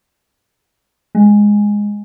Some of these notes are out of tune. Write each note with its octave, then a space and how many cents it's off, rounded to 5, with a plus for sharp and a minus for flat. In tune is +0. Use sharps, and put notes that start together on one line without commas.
G#3 -5